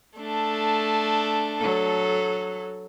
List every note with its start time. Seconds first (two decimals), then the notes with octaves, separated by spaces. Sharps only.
0.18 A3 D4
1.58 F#3 A4